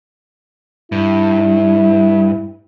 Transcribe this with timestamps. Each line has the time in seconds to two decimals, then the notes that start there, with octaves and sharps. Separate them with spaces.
0.92 G2 E4